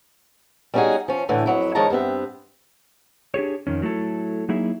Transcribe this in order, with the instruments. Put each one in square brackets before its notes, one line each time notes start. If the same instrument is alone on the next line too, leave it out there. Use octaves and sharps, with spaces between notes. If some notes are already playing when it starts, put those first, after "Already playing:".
[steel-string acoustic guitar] G3 B3 C#4 D#4 F#4 G#4
F3 C#4
A2 D3 E3
F2 F#3 E4
D#3 F3 G#3 C#5 A5 A#5
G2 B3 C4 E5
[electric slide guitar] D4 G4 G#4 C#5
F2 D#3 C#4
F#3 A3 E4 A4
F#3 A#3 D#4 E4 G#4 E5